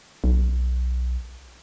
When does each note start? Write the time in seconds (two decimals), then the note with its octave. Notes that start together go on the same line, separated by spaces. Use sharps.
0.24 B1